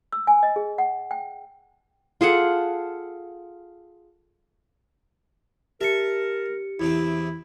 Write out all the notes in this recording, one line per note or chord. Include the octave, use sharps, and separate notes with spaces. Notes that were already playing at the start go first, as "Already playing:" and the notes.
E6
G#5
D#5
G#4
F#5
G5
F4 G#4 A4 F#5
G4 A#4 E5 A5 C#7
E2 C3 C4 E4